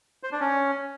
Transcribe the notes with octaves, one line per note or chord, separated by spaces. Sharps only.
C5
D4
C#4